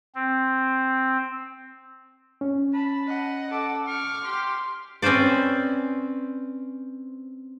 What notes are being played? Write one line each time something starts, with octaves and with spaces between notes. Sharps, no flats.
C4
C#4
A5 B5
D#5 F#5
A4 D6
C#6 D6 F6
G4 C6
C4 C#4 B4 C5 D5